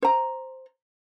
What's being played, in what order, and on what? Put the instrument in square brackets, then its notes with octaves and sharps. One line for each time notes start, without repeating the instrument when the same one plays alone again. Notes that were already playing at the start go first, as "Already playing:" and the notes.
[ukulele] C5 A#5